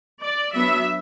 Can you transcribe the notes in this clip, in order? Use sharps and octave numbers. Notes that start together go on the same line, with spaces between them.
D5
F#3 B3 D4 E5